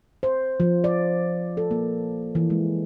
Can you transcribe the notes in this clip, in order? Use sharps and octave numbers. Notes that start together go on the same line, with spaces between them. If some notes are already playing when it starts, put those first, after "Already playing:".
C5
F3
D5
A4
A#3
E3
G#3